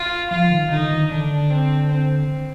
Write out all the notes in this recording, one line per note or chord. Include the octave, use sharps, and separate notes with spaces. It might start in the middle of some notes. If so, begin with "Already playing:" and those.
Already playing: F4
F3 F4
D#3
D3 D#4
D#3
D3 D4
C4
C4